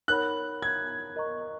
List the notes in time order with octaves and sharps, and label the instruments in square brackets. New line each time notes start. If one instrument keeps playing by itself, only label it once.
[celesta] D#4 A#4 C#5 F#5 B5 [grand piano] F#6
[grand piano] G#6
[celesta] A#4 D#5 A#5 C#6